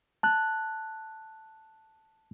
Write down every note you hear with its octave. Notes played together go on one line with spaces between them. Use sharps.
A5 F#6